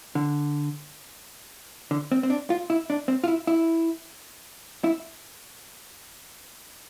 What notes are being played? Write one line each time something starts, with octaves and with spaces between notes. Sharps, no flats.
D3
D3
C4
C4
D4
F4
E4
D4
C4
F4
E4
E4
E4